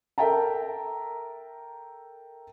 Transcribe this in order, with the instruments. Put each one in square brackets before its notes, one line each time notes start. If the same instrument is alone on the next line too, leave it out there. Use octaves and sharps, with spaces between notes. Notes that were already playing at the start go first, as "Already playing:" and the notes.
[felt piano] A4 A#4 E5 G5 A5 A#5